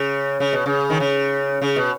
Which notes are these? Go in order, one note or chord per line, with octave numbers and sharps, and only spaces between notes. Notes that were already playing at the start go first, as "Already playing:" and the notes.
Already playing: C#3
C#3
B2
C#3
D#3
C#3
C#3
B2